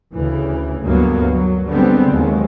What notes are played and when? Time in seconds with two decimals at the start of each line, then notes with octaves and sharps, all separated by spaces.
0.12 D2 C#3 E3
0.84 D2 G2 F#3 A#3 B3
1.31 F#3
1.67 D3 G3 G#3 B3 C4
2.11 D#2 F#3 G#3